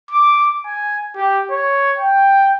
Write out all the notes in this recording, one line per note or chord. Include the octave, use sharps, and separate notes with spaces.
D6
G#5
G4
C#5
G5